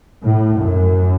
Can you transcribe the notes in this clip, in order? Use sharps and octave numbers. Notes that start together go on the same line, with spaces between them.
A2
F#2